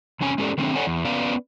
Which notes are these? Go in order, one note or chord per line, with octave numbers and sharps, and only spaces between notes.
E2 C3 C#4 G#5
G#3 C#4 G4 A4 D5
D#3 A3 C4 D4
A4 C#5 D5 F#5 G#5
E2
B3 C#4 B4 D5 F5